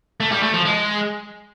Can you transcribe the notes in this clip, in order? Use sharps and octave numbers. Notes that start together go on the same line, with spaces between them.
A3
G3
A3
F3
G#3